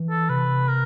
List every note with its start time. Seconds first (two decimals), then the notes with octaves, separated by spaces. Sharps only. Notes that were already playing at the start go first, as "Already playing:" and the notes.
Already playing: E3
0.10 A4
0.29 C3 B4
0.68 A#4